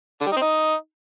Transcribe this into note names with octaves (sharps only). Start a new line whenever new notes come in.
D3
G3
D#4
C4
D#4